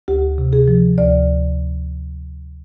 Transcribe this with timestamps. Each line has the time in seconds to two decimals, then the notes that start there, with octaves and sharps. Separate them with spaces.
0.08 D2 G4
0.38 C3
0.53 G#4
0.68 F3
0.98 D2 D5